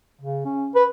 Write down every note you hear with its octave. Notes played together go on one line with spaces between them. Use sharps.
C#3
C#4
B4